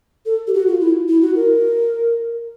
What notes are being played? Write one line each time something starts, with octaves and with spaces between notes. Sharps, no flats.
A4
G4
F#4
F4
E4
E4
F#4
A#4